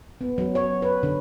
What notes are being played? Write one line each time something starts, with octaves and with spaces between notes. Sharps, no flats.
B3
F#3
C#5
B4
D3